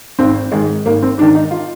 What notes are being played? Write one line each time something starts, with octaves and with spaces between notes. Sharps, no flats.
G#1 C4
G#2 D#3 G#3
G#1 A#3
C4
G#2 D#3 D4
D#4
F4